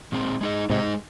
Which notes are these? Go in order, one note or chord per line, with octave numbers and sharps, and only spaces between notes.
A#2 G#3 C4
G#3 D#4 G#4 D#5
G#2 C3 G#3 D#4 G#4 D#5